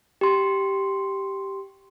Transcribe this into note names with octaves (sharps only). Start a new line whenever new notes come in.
G4 C6